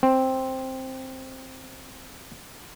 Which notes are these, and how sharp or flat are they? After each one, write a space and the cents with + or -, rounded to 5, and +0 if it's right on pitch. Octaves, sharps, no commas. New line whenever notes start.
C4 +5